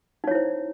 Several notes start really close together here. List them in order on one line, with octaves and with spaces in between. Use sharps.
D#4 C#5 E4 C5